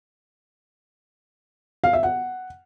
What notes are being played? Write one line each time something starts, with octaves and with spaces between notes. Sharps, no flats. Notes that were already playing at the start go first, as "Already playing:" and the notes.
F5
E5
F#5